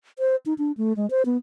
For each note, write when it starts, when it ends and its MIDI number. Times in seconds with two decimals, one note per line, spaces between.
0.19 0.36 72
0.46 0.54 63
0.58 0.72 62
0.77 0.93 57
0.96 1.09 56
1.10 1.23 72
1.26 1.37 59